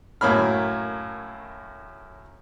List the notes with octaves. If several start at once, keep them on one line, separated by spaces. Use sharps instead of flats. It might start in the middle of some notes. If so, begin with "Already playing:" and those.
F#2 A2 A#3 C#5 B5 F6